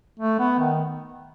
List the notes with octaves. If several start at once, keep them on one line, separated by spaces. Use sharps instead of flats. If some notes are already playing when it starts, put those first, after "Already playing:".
A3
B3
D#3